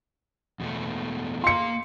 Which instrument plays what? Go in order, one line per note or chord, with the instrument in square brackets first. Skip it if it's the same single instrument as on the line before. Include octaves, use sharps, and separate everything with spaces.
[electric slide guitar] E2 B2 A3
[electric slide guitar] A#3 F5 [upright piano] C6 C#7